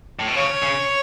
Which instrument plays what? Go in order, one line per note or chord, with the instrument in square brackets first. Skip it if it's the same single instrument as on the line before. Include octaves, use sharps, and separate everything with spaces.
[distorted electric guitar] A2
B2
[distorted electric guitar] C#3 [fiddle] C#5
[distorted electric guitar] C#3